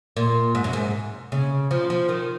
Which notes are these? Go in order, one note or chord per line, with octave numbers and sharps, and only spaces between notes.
A#2
G#2
F#2
G#2
C#3
F3
F3
D#3